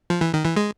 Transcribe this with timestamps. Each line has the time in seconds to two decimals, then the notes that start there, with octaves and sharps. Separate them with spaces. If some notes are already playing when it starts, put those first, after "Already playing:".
0.10 F3
0.21 E3
0.34 D#3
0.45 E3
0.56 G#3